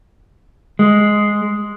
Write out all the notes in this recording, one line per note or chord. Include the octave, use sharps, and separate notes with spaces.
G#3